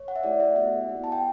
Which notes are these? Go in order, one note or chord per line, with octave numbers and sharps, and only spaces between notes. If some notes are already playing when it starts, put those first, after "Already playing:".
Already playing: C#5
F#5
E5
A3 E4 G4 D5
E5
B3 F#4 A4 F#5
B3 E4 G4
A5
G5